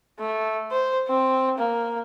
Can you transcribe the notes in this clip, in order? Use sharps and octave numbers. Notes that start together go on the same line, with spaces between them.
A3
C5
C4
A#3